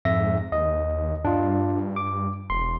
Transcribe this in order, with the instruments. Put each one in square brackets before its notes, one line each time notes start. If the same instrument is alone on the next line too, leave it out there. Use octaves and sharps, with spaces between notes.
[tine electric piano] F2 E5 A#6 [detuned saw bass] G#2
[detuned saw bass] D#2 [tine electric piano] D#5
[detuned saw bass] G2 [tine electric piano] D4 F4
[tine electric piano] D6
[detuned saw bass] E1 [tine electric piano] C6